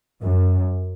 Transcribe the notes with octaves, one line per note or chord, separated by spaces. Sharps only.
F#2